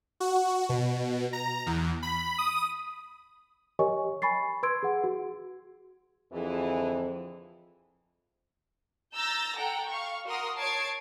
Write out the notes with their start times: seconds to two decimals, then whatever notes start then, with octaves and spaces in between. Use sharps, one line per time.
0.20 F#4
0.69 B2
1.33 A#5
1.66 E2
2.03 B5
2.38 D#6
3.79 G4 A#4 C#5 D#5 G#5 C#6
4.22 G#5 B5 C#6 A6 C7
4.63 B4 C6 E6 G#6 D7
4.83 G#4 F#5
5.04 F#4
6.33 F2 D3 E3 G#4
9.15 A#5 E6 G6 A6 A#6
9.58 A4 F#5 G5 A#5
9.88 F5 C#6
10.26 F#4 A#4 C6 D#6
10.59 C#5 A5 G#6 C7 D7